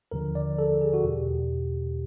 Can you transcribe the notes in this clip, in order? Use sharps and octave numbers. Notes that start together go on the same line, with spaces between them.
D#2 D3 F3 A#4
D5
A4
G#4
F#4
E2 B2 G4